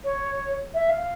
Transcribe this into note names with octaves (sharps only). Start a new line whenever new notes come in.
C#5
E5
F5